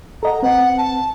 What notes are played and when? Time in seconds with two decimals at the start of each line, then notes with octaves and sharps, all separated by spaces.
0.23 A4 D#5 F#5 A#5
0.43 C4 B4 F#5
0.78 A5